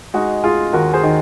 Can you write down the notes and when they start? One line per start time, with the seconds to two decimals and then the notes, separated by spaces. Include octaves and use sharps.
0.14 G#3 D#4 F#4
0.44 G#3 F4 G#4
0.73 D#2 F#4 A#4
0.94 G#4 C5
1.03 D#3